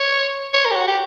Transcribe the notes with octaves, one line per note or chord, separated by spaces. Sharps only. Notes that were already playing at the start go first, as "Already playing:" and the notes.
Already playing: C#5
C#5
A#4
G4
F#4
G4